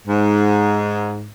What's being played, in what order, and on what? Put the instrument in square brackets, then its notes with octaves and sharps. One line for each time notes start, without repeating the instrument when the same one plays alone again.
[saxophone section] G#2